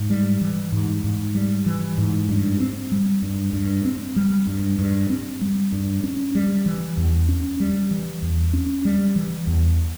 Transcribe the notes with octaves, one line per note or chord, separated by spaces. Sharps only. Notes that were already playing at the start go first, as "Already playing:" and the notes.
Already playing: G#2
G3
E3
G#2
G#2
G3
E3
G#2
G2
C4
G3
G2
G2
C4
G3
G2
G2
C4
G3
G2
C#4
G3
E3
E2
C#4
G3
E3
E2
C#4
G3
E3
E2